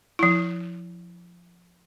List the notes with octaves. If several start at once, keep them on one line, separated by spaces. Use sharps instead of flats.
F3 E4